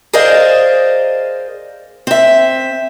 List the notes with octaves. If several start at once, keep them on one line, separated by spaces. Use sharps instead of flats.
G#4 A#4 C5 D5 D#5 F5
C4 E5